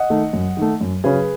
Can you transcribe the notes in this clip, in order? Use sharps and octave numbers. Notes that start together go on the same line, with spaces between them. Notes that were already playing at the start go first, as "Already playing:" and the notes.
Already playing: D#5 F#5
D#3 A3
F#2
D#3 A3
F#2
C#3 F#3 C#4 G#4 B4